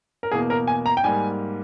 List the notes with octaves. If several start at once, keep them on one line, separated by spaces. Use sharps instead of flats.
A#4
E2 B2 A#3 G#4
A#4
G#5
A#5
G5
G#2 G3 A#3 G#5